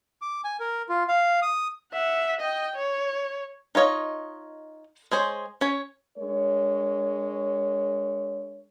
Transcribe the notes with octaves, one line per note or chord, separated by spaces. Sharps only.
D6
G#5
A#4
F4
F5
D#6
E5 F#5
D#5 G5
C#5
D#4 F4 C#5 D#5
G#3 G#4 C5 C#5
C#4 C#5
G#3 D4 A#4 C#5